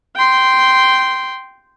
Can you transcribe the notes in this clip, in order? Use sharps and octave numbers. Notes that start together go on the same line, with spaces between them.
G5 C6